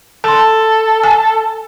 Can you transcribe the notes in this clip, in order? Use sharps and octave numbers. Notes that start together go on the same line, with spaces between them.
A4 A5 C6
G#5